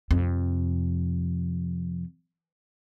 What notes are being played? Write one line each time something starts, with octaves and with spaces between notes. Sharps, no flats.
F2 C3